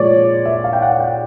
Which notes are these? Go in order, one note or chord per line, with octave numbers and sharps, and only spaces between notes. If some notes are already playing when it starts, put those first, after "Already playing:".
Already playing: A#2 F3 G#3 C#5 D5
E5
F5
G5
F#5
F#5
G5